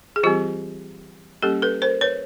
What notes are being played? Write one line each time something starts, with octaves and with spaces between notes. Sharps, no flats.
G#4
E3 G3 C4 F4 G4
G3 A#3 C#4 G4 A4
A4 B4
A#4 C5
B4 C#5